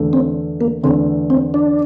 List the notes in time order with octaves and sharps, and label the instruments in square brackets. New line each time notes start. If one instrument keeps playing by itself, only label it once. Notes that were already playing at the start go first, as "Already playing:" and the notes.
Already playing: [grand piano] E2 D3 A3
[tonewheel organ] C4
A#3
[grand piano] E2 D3 A3 [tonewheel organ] C4
[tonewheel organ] C4
D4